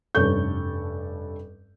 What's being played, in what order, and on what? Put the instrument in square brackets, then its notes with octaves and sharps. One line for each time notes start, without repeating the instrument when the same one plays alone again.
[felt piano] F1 G2 C#4 A4 C#6 G6